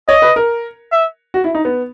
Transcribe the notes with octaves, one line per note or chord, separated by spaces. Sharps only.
C#5 D#5
B4
A#4
E5
F#4
E4
D#4
B3